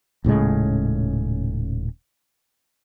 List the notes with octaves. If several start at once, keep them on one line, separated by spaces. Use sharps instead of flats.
D#1 A2 C#3 G#3